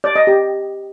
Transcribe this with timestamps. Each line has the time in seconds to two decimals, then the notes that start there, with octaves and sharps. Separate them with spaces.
0.04 D5
0.16 D#5
0.27 G4